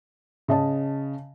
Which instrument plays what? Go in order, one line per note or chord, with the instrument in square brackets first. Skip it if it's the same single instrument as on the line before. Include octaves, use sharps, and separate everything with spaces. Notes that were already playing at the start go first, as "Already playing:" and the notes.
[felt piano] C#3 D#5 A5